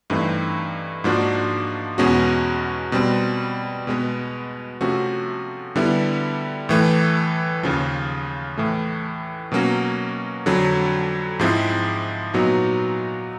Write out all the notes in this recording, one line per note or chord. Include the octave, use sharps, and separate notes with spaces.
G2 E3 A3 C4 D#4
G#2 F3 A#3 D4 F#4
E2 B2 G#3 C#4 F#4
B2 G3 C4
B2 G#3 B3
C3 F3 A3 C#4 F#4
D3 G3 B3 E4
A2 E3 A3
D#2 C#3 F3
A2 E3 A3
B2 F#3 A#3 C#4 F#4
F2 D3 F#3
G#2 F3 G#3 C4 E4
A#2 F#3 B3 D#4 F#4